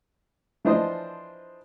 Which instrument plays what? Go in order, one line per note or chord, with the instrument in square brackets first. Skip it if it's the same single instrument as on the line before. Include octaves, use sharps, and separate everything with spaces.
[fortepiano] E3 F3 D4 F4 C5 D#5